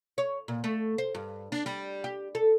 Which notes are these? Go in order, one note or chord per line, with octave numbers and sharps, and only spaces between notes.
C#5
A#2
A3
C5
G2
D4
G3
G4
A4